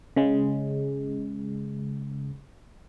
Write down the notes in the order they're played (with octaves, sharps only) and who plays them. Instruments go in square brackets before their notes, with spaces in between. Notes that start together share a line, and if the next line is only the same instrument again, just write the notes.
[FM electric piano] C#3 G#3